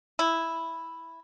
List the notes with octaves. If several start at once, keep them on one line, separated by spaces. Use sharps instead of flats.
E4